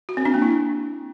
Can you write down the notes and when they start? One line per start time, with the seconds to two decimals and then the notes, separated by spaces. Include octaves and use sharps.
0.09 F#4
0.17 C4
0.25 D4
0.34 A#3
0.42 E4